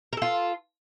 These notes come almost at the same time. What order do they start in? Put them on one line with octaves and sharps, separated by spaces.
A#4 A4 F4